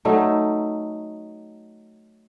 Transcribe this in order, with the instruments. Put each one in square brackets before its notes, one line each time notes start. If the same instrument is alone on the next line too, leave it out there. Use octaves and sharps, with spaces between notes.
[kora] F#3 A3 D#4